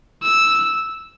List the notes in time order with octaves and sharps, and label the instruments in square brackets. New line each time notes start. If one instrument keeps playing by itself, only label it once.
[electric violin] E6